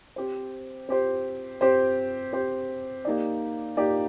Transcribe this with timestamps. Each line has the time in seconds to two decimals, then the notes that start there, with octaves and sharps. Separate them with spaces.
0.16 C4 G4 C5
0.89 C4 G4 C5
1.61 C4 G4 C5
2.33 C4 G4 C5
3.05 A#3 D#4 G4 D5
3.77 A#3 D#4 G4 D5